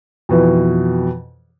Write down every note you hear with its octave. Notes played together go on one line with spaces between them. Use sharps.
F2 B2 E3